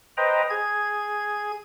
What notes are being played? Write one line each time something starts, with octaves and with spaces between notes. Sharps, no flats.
B4 C5 D#5 G5 A#5
G#4 G#6